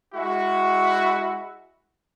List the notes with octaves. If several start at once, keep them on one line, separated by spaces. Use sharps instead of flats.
G#3 E4 F#4